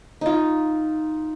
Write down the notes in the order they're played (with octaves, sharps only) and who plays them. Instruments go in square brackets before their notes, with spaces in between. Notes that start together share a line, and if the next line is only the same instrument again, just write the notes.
[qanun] D#4 F4